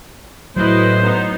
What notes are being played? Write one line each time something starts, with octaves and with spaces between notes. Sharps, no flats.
A2 F#3 E4 B4 C5 D#5
B3 D#4